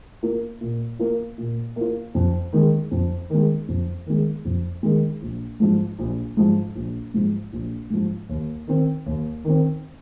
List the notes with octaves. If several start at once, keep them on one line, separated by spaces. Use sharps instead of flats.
A#3 F4
A#2
A#3 F4
A#2
A#3 F4
F2
D#3 G#3
F2
D#3 G#3
F2
D#3 G#3
F2
D#3 G#3
A#1
G#2 F3
A#1
G#2 F3
A#1
G#2 F3
A#1
G#2 F3
D#2
D#3 C4
D#2
D#3 C4